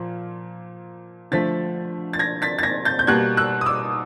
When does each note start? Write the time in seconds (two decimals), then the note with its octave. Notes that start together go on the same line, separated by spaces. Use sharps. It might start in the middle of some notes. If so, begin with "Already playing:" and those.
Already playing: A#2 F3
1.31 D3 F3 A3 A6 B6
2.13 A6
2.19 G#6 A#6
2.42 A6 B6
2.59 A6
2.63 G#6 A#6
2.85 G6 A6
2.99 G6
3.07 B2 G3 A#3 F#6 G#6
3.37 E6 F#6
3.61 D#6
3.66 D6 E6